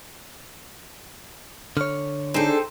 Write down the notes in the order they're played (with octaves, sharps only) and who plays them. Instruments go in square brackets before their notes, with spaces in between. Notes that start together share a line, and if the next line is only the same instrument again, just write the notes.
[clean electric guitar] D3 C#5 [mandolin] F6
[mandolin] C4 D#4 C5 [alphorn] D4 [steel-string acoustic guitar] G#4 A4